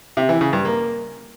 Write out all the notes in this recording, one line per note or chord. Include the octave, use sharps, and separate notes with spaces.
C3
E3
C#3
G2
A#3